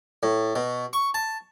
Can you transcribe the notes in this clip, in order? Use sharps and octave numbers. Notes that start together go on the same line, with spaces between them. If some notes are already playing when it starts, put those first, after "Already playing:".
A2
B2
C#6
A5